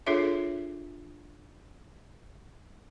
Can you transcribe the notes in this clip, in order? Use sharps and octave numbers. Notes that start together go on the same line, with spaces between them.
D4 F4 G#4 A4 C#5 E5